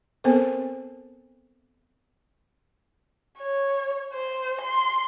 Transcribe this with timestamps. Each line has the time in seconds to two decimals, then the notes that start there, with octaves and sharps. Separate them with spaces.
0.24 B3 C4 A4 A#4 C5
3.39 C#5
4.14 C5
4.61 C6